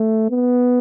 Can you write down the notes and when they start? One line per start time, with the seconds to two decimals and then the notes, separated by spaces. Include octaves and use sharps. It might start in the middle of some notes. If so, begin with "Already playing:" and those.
Already playing: A3
0.30 B3